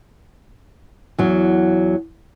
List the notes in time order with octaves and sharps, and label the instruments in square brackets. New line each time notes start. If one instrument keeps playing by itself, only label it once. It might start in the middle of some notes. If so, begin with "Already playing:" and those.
[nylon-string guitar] E2 F#3